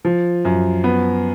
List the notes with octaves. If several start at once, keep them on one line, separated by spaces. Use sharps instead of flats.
F3
F#2
B3